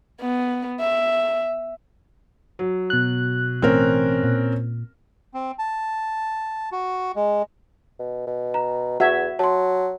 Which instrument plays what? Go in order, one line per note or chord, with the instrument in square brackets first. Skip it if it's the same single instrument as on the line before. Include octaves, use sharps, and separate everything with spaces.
[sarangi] B3
E5
[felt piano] F#3
[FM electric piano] B2 F#6
[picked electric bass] A1 E3 A3 [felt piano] C4 C#4 A#4
[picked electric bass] A#2
[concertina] C4
A5
F#4
G#3
[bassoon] B2
B2
[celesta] A#5
[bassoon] E2 [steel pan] F#4 E5 [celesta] F#5 G#6
[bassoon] F#3 [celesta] A5 C6